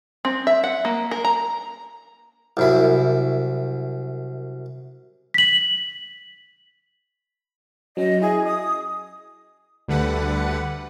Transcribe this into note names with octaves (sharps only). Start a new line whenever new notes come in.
C4
E5
F#5
A#3
A#4
A#5
C2 F#2 E4
B6 F#7
F#3 C#4 D#5
E4 G#4
D#5 D#6
D2 D3 G3 B4 F#5